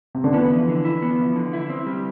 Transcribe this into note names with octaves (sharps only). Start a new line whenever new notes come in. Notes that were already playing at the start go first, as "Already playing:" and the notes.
C3
D3
E3 B3
F3
D3
E4
B3
F3
D3
E4
C4
G3